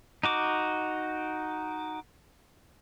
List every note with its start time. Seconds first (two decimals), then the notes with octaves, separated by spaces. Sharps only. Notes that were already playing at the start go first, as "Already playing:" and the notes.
0.23 D#4 F#4 D6